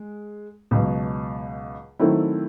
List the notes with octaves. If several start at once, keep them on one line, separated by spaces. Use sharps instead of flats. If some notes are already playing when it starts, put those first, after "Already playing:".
Already playing: G#3
C#2 B2 F#3
D#3 F#3 A3 C4 E4